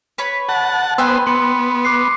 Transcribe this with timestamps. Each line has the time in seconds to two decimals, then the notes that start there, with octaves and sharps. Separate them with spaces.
0.18 B4 C#5 B5
0.49 F#5 A5
0.98 B3 B4 C5 G5 G#5 E6 F#6
1.27 B3 C6 C#7
1.85 D6 F#6 C7